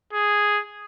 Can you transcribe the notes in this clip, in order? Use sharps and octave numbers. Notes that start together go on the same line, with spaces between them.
G#4